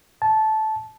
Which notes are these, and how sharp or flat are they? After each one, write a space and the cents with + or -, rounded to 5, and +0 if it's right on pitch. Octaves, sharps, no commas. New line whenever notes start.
A5 -15